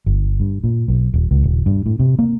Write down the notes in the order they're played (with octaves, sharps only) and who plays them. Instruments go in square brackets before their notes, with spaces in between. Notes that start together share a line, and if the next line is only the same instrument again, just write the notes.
[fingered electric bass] G1
G2
A#2
B1
D#1
C#2
D#1
G2
A2
C3
A#3